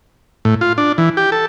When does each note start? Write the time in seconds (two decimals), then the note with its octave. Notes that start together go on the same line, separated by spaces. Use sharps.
0.45 A2
0.61 F4
0.78 D4
0.98 E3
1.17 G4
1.32 A4